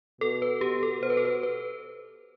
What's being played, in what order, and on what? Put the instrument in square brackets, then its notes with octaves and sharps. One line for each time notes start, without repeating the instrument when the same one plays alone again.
[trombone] B2 [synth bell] A4
[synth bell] B4
[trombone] B2 [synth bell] G4
[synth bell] A4
[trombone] B2 [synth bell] C5
[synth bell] B4
A4
B4
B4